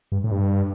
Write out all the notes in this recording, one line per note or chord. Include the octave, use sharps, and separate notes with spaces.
G2
A2
G2